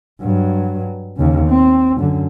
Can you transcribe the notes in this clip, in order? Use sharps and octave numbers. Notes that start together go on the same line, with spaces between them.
G2 F#3
D#2 C#3
C4
F#2 D3